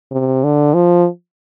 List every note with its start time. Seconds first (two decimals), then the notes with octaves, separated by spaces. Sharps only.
0.12 C3
0.44 D3
0.74 F3